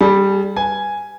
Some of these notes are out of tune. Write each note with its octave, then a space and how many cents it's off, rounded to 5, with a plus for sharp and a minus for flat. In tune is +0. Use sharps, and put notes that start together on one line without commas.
G3 +0 G#4 +40
B4 +0 G#5 +0